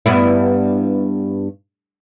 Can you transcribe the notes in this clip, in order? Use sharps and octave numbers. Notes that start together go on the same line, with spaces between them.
G2 B3 E4